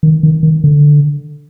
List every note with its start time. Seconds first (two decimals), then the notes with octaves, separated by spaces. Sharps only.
0.03 D#3
0.23 D#3
0.43 D#3
0.64 D3